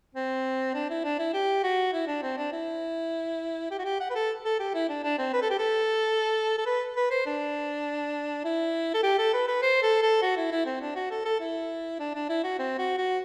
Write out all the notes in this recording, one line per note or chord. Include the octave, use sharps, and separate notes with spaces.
C4
D4
E4
D4
E4
G4
F#4
E4
D4
C4
D4
E4
G4
F#4
G4
F#5
B4
A4
A4
G4
E4
D4
D4
C4
B4
A4
G4
A4
A4
B4
B4
C5
D4
E4
A4
G4
A4
B4
B4
C5
A4
A4
F#4
E4
E4
C4
D4
F#4
A4
A4
E4
D4
D4
E4
F#4
C4
F#4
F#4